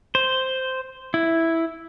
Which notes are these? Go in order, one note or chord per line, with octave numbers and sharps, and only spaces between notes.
C5
E4